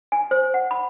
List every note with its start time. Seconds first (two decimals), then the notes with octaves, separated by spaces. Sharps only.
0.12 G#5
0.31 C5
0.54 F#5
0.71 B5